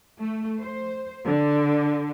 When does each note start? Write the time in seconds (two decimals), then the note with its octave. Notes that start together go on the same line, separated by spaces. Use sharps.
0.20 A3
0.60 C5
1.25 D3